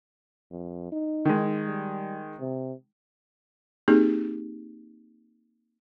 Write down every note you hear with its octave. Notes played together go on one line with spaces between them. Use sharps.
F2
D#4
D#3 G#3
G3
C3
A#3 C4 D#4 G4 G#4